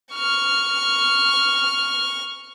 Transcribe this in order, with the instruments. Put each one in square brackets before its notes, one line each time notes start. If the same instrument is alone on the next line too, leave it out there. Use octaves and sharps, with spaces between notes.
[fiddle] C#6 F6